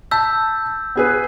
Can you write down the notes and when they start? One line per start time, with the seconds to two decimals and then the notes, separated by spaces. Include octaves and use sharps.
0.11 A5 E6 G6 B6
0.96 B3 G#4 B4